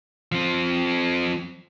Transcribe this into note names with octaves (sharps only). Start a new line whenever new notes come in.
F3 C4